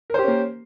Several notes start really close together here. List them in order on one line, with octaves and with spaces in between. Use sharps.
A#4 C5 G4 C#4 A#3